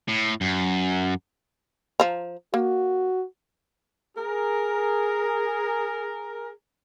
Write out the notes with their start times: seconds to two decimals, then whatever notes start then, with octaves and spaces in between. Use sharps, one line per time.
0.09 A2
0.41 F#2
2.00 F3 A#5
2.54 A#3 F#4
4.17 G#4 A#4